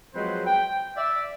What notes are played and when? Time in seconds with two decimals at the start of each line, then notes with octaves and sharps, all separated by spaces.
0.14 F3 F#3 G#3 C4 B4 C5
0.46 G5
0.96 D5 E5